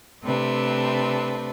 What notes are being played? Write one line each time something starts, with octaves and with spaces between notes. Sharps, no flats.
C3 A3 C4 D4 B4